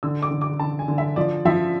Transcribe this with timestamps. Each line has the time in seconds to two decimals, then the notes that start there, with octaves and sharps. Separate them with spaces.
0.03 D3 E6
0.22 D6
0.31 D3
0.41 D6
0.59 D3 A5
0.79 G#5
0.88 D3
0.98 E5
1.16 F3 D5
1.45 F3 E5